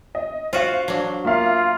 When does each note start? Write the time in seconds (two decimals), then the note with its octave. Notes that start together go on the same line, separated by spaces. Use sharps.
0.15 D#5
0.53 F4 F#4 C5 F5
0.88 F#3 D4
1.25 A#3 F4 E5 F5